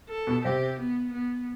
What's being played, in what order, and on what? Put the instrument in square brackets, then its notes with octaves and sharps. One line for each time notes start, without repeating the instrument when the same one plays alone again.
[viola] A4
[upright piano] B2 B3
[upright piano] C3 C4 [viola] G4
[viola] B3
B3